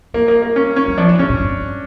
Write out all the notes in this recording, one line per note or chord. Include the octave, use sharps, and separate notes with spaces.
G3 A#3
A#3
A#3
C#4
C#4
G3
F3 D4
E3
C#3 C#4
A#2
G2